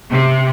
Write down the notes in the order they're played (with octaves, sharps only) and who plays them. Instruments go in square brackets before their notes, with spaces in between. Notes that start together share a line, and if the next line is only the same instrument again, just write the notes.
[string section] C3